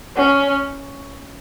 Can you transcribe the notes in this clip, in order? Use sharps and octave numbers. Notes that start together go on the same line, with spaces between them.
C#4